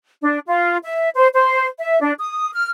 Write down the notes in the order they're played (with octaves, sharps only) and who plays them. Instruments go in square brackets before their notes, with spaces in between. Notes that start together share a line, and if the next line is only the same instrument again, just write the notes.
[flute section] D4
F4
E5
C5
C5
E5
D4
D#6
F6